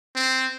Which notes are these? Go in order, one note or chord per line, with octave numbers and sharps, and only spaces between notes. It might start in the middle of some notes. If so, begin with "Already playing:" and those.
C4